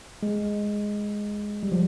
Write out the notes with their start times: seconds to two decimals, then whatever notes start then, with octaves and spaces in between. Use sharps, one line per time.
0.23 G#3
1.63 G3
1.72 F3